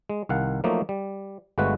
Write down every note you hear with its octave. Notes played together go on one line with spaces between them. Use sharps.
G#3
C2 D#3 F5 F#5
F3 F#3 A3 A#3 D#4
G3
G1 G#3 A3 F#4 B4 F#5